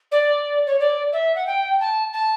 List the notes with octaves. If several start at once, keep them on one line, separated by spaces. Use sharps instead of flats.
D5
C#5
D5
E5
F#5
G5
A5
A5